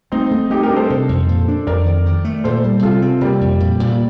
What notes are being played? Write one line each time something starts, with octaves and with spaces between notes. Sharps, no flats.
A3 C4 D#4
A3
A3 D#4 G4
G4 A#4
D4
A4 C5
C3
F2
A#2
D4
F2 A#4 D5
D#3
D#3
A3
A#2 A4 C5
G3
C3 F4 A4
C4
C3 G3 A#3
F2
A#2
A#2